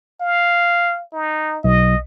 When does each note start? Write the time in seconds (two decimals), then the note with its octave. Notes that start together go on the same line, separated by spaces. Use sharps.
0.21 F5
1.13 D#4
1.64 B1 D#5